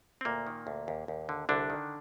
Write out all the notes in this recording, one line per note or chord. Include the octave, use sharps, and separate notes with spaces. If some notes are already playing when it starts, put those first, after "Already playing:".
C4
D2 A#2 A#3
D#3
D2
D#2
D#2
D3
C2 D3 D4
D#3